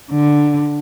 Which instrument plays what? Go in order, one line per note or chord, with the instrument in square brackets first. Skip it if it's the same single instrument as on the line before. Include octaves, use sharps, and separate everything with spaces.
[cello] D3